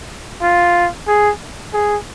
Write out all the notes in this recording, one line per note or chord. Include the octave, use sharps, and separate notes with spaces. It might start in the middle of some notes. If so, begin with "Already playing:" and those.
F4
G#4
G#4